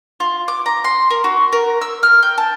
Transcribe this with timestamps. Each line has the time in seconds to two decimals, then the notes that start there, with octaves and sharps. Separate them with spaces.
0.20 F4
0.48 D6
0.66 A#5
0.84 C6
1.10 A#4
1.24 F#4
1.53 A#4
1.82 E6
2.03 F6
2.23 G5
2.38 A5